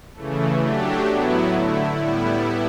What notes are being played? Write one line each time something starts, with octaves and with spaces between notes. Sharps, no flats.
C#3 E3 A3
F#3 A3 D4 G4
A2 F#3 B3 E4
D3 A3 E4
A2 G3 B3 E4